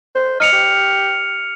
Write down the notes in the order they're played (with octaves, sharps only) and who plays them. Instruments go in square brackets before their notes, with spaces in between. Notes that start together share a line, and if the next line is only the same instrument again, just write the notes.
[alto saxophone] C5
[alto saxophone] D#5 [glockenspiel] F6 C#7 F7
[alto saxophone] G4